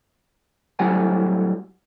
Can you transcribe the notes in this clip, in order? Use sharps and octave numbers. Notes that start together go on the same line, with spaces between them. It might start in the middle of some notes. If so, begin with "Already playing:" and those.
A2 F#3 G3 C4 F#5 G#5